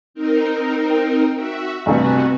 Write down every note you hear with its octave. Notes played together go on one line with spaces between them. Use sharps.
C4 D#4 A#4
G5
F#4 E5
A1 G2 C3 B3 C4 F#4